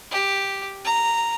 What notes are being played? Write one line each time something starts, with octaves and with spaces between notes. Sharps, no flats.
G4
A#5